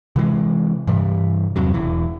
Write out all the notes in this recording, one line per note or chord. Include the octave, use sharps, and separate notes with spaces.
C3 E3 F3 G#3
G2 C3 E3 G3
E2 G2 C3 F#3
E1 E2 E3